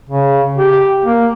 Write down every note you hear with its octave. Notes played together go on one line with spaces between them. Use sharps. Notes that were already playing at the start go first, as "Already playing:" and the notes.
C#3
G4
A#3